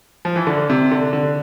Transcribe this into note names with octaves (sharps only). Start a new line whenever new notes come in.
F3
E3
D3
C3
D3
D3